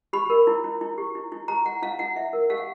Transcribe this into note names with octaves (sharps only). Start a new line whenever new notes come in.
G4 B5
A#4
E4
E4
E4
G4
E4
E4
G4 A#5
E4 F#5
E4 F5
E4 F#5
E4 E5
A#4
G4 F5
F#5